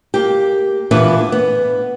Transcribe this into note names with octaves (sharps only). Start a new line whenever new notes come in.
A#3 G4
A#2 E3 B3 D4 B4
B3